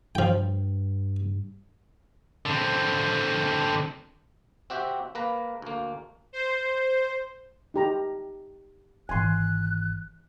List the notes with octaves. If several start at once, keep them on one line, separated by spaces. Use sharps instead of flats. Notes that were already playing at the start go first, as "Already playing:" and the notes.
G2 F3 G5
D3 C4
C4 F#4 G4 E5
A#3 B4 A#5
D2 A#3
C5
D#4 G4 A#5
G#1 E3 G#5 C6 F#6